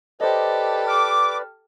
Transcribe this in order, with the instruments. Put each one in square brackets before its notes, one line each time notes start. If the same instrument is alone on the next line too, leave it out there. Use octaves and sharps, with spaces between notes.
[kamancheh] G4 A4 [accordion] B4 D5 [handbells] C5 D#5
[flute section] D6 [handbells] F6